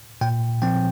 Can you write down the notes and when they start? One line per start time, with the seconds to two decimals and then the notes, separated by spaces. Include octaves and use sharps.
0.21 A#2 G5
0.62 F3 C4 G5